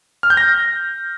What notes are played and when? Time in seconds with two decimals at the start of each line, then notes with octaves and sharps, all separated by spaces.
0.23 F6
0.30 G6
0.37 A#6